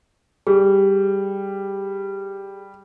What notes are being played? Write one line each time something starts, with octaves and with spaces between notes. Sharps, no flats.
G3 G#4